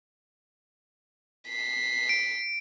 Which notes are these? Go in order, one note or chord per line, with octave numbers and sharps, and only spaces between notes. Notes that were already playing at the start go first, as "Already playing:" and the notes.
B6 C7
D7